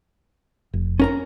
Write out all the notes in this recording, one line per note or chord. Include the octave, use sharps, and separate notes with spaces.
F1
C#4 A#4 A#5